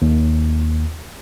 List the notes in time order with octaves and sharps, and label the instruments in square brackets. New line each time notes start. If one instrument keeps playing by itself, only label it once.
[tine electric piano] D#2